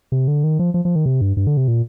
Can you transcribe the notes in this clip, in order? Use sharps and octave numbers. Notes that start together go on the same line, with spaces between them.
C3
D3
D#3
F3
F3
F3
D#3
C3
G2
G2
D3
C3
A#2